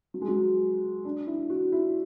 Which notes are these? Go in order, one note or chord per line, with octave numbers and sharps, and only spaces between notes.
F#3
G#3
F#3
D4
E4
F#4
E4